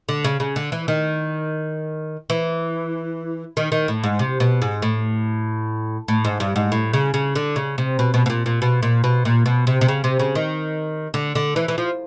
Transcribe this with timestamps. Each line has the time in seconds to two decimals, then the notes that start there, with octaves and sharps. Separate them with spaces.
0.09 D3
0.24 C#3
0.40 C#3
0.56 D3
0.72 E3
0.88 D#3
2.30 E3
3.57 D#3
3.72 D#3
3.88 A2
4.04 G#2
4.19 C3
4.40 B2
4.62 G#2
4.82 A2
6.08 A2
6.25 G#2
6.40 G2
6.56 G#2
6.72 A2
6.93 C#3
7.14 C#3
7.35 D3
7.56 C#3
7.78 C3
7.99 B2
8.14 B2
8.26 B2
8.30 A#2
8.46 A#2
8.62 B2
8.83 A#2
9.04 B2
9.25 A#2
9.46 B2
9.67 C3
9.81 C3
9.88 C#3
10.04 C3
10.19 C#3
10.35 D#3
11.14 D3
11.35 D3
11.56 E3
11.68 E3
11.78 F3